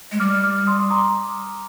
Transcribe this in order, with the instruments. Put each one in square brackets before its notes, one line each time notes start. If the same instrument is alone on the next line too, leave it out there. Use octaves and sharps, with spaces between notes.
[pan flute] G#3
[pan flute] G3 [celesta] D6 F6
[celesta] D6 F6
C6 D#6
C6
A#5 D6